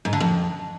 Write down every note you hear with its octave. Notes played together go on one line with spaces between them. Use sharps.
G#2
D3
F2